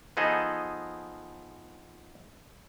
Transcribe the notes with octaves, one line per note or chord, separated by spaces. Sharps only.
F3 B3 D#4 G#4 A4 D#5